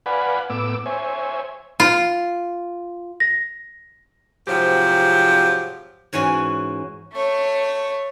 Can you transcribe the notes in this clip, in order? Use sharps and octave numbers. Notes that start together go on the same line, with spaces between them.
B4 D5 F5 F#5 G#5 B5
A2 B3 D6 E6
C5 C#5 E5 G#5
F4
A#6
G#2 C3 F3 F#3 C4 G4
G#2 E3 C#4 F#4 G#5
A3 C#5